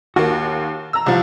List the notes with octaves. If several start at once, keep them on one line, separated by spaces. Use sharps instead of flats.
D#2 A#3 F#4
A#5 E6
C2 F3